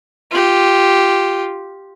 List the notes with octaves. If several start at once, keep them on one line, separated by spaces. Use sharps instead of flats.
F4 G4